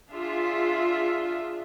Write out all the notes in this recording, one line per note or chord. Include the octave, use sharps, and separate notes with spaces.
D4 F4 G#4 E5